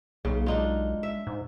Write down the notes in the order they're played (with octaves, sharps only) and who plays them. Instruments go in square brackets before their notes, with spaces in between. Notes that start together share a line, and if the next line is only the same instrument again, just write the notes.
[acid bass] B1 [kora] C#3 [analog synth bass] A#3
[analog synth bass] G#3 [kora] D4 D#4 F4
[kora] E5
[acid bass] G#2